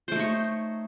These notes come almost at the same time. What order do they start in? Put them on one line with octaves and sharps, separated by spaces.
C5 A3 D#4 C#5